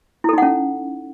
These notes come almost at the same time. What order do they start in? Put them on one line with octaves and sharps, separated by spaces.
E4 A4 D#4 F#5 C#4